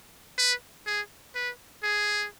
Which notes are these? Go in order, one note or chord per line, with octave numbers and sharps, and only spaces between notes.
B4
G#4
B4
G#4